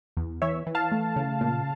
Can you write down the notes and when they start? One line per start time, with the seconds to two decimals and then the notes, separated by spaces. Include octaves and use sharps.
0.17 E2
0.42 E3 C#5 E5
0.67 E3
0.75 F5 A5
0.92 A3
1.16 C#3
1.41 A#2